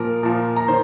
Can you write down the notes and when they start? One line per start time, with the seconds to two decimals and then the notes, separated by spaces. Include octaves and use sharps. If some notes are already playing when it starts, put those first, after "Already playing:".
Already playing: A#2 F3 A#4
0.23 A#2 F3
0.56 A#5
0.68 D#3 C5